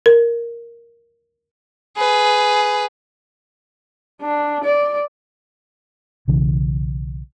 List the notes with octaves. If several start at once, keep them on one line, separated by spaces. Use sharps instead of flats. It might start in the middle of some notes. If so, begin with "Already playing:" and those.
A#4
G#4 B4
D4
D5
B1 C#3 E3